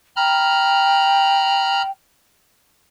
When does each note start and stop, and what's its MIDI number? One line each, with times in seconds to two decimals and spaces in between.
0.16 1.90 79
0.16 1.82 82
0.16 1.82 83
0.16 1.82 89